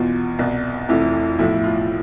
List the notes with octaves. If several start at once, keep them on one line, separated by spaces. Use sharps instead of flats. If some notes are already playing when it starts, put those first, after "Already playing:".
Already playing: E2 B2 F4
C2 B2
F1 F2 C3 E3 E4
B1 A2 F3 E4
F4